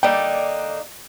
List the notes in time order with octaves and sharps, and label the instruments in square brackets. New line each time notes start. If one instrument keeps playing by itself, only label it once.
[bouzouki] D3 A#3 D#4 [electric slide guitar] D5 G5